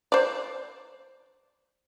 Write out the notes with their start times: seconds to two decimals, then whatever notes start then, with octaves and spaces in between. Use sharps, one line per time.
0.12 C5 D5